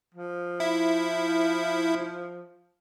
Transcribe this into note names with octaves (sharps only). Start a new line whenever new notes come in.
F3
E4